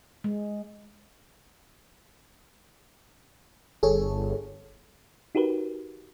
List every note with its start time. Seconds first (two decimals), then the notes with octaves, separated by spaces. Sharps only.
0.24 G#3
3.83 G1 G#4 A4 C#5
5.35 D#4 F#4 G4 A#4 B4